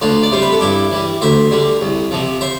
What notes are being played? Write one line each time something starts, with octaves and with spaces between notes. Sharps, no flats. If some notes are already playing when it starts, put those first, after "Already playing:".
D2 D4 F4
D5
C3 G3 C5
B4
A4
G2 E4 G4
E3 G3
D2 C5 E5
D3 G3
C2
C3 F3
C5 E5